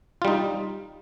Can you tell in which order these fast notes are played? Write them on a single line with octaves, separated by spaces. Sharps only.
F4 G3 D#4